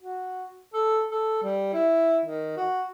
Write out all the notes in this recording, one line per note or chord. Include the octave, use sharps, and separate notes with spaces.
F#4
A4
A4
G3
E4
D#3
F#4